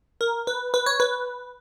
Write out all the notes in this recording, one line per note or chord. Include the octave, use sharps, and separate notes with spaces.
A#4
B4
B4
C#5
B4